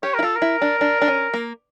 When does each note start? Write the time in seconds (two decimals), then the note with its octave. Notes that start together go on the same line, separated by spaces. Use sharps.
0.03 G4 C#5
0.14 E4 A#4
0.23 F4 A4
0.35 A#4
0.42 E4
0.62 D4
0.81 D4
1.02 D4
1.08 C#4
1.34 A#3